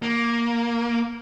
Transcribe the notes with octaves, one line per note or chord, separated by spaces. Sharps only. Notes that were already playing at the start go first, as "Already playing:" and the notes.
A#3